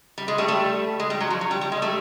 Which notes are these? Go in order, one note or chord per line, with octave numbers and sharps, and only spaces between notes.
G3
G#3
G3 A3
G3 A3
G#3
G3
F#3
F3
F#3
G3
G3
G#3
G3 A3